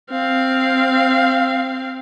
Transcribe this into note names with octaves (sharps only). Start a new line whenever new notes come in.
C4 F5